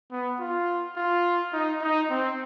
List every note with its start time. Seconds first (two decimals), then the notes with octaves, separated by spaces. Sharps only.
0.11 B3
0.40 F4
0.96 F4
1.53 D#4
1.82 D#4
2.10 C4